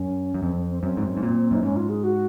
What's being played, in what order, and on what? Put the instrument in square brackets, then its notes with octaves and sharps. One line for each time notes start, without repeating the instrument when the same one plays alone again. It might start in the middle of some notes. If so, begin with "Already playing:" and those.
Already playing: [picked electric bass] F#2 [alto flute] C#4
[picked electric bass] F#2
[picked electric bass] F2 [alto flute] C4
[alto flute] C4
C4
[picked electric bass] F#2 [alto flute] C4
[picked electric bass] G#2
F#2
G#2
A#2
[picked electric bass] F#2 [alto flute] D#4
[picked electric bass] G#2 [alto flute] C#4
[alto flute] F4
G#4
F#4